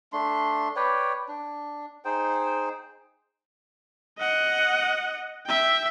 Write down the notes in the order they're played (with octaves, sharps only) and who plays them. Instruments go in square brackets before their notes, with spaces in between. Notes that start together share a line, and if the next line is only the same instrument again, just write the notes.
[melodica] A3 D4 C6
B4 C#5 D5 G5
D4
D#4 G#4 C5 G5
[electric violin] D#5 F#5
E5 G5